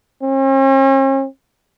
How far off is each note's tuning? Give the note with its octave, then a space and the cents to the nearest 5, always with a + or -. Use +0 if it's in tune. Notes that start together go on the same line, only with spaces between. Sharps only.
C#4 -45